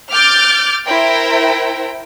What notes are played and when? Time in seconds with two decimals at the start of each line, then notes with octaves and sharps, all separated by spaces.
0.11 D6 F6 G6 A6 D7
0.86 E4 A#4 C5 G5